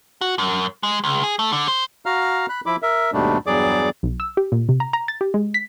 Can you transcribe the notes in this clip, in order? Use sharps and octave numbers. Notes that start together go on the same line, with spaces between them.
F#4
F#2
G#3
C#2
G#4
A3
D3
C5
F#4 F5 A#5 F6
B5 F#6
F3 E4 B5 D6
A#4 E5
D#2 G#2 B2 G3 A3 D4
E2 G2 F#3 G#4 D5 D6
B1
E6
G4
A#2
C3
A#5
A#5
A6
G4
G#3
B6